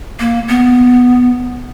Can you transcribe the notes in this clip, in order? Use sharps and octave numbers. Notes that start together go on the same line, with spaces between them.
A#3
B3